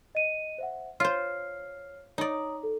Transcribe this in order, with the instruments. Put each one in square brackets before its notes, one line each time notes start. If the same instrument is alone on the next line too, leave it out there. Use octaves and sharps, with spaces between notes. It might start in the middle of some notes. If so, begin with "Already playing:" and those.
[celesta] D#5 D#7
C5 E5 F#5
[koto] F4 C5 [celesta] C#5 F6 C7
[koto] D#4 D5 [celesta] C#5 A#5 D#6
[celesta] A4